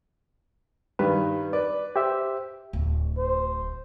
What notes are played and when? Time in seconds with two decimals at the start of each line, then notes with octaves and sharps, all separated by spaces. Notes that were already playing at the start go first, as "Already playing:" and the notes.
0.99 G2 D#3 B4
1.53 B4 D5
1.96 G4 C5 E5
2.73 D1
3.18 C5